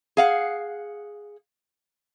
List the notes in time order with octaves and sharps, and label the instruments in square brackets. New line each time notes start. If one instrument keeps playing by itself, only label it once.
[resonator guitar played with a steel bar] G#4 F5 F#5